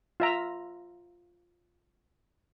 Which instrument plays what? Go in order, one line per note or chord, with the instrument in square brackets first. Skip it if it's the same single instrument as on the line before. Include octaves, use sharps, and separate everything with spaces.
[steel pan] F4 E5 A#5